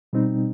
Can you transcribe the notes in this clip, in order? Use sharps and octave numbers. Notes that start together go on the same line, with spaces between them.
B2 G3 C4 D#4